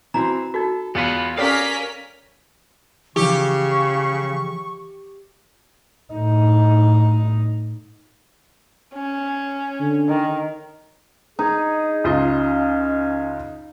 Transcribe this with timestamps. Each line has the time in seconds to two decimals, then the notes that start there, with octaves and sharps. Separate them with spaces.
0.14 E3 C4 F#4 A#5
0.54 D#4 F#4 A4
0.95 E2 B3 F4 B4
1.37 C#4 G4 A4 A#4 D5 F5 B6
3.16 C#3 E3 F3 G4 C#6
6.14 A2 D#4
8.94 C#4
9.80 D3
10.09 D#3
11.39 D#4 G#4
12.04 C#2 C#4 F4 D#5